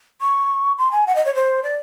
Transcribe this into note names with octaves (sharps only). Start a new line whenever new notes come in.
C#6
C6
G#5
F#5
D#5
C#5
C5
D5